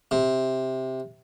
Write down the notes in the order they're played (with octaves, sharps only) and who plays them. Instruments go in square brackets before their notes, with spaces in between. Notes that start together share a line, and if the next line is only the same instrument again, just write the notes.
[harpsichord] C3